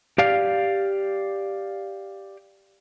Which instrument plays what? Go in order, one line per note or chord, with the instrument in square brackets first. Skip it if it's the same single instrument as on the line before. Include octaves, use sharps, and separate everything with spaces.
[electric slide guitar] G4 D5 F5